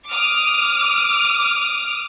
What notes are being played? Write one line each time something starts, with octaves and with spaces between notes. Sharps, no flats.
D6 D#6 F6